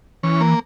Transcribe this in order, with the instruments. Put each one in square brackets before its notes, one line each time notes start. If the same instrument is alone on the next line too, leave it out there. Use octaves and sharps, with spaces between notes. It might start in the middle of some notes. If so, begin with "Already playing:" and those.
[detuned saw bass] E3 [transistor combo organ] C#4
[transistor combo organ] A#3